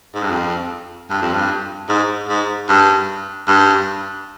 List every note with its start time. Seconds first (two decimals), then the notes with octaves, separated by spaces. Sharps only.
0.15 G#2
0.23 G2
0.31 F2
1.10 G2
1.22 F2
1.34 G2
1.89 G#2
2.29 G#2
2.69 G2
3.48 G2